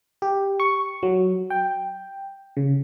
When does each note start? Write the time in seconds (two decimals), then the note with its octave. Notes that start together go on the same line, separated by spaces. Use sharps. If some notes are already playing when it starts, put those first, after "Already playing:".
0.22 G4
0.60 C#6
1.03 F#3
1.50 G5
2.57 C#3